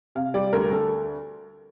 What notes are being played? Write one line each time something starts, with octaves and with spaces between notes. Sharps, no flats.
C3 F5
G3 D5
D2 A#4
D2 A4